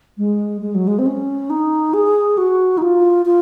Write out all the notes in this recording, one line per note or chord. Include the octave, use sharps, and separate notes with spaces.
G#3
G#3
F#3
G#3
C4
C#4
D#4
G#4
F#4
D#4
F4
F4